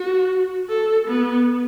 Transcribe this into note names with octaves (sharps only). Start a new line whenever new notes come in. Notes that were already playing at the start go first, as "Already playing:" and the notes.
Already playing: F#4
A4
B3